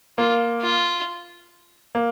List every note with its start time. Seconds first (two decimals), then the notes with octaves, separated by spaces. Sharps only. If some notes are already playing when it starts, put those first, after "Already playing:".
0.18 A#3 F4
0.61 F4
1.95 A#3